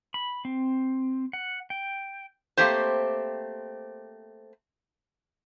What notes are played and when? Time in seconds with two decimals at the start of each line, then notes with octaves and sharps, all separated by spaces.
0.14 B5
0.45 C4
1.33 F#5
1.70 G5
2.57 A3 A#3 C4 G4 C5